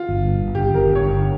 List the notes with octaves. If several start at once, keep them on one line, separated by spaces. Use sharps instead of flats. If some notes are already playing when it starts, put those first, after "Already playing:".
Already playing: F4
G1
G2
G1
G1 G4
G1
A#4
G1
C#5
G1